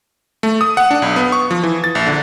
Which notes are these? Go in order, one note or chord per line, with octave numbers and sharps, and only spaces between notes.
A3
D#6
F#5
D4
B1
B3
C#6
F3
E3
A6
A#1
D3